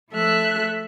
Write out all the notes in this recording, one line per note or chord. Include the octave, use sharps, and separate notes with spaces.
F3 A3 A4 E5 F#6